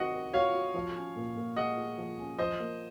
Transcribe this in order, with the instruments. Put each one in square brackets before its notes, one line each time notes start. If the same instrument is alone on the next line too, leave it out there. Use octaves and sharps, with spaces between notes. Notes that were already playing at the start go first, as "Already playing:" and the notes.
Already playing: [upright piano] D#3 C4 F#4 [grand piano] D#5 F#5
[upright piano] D#3
[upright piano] F#4 [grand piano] C#5 F5
[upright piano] F#4
F3
C#4
A#2
A#2
[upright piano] G#3 [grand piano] D#5 F#5
[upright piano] G#3
F3
C#4
[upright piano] F3 [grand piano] C5 D#5
[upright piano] A#3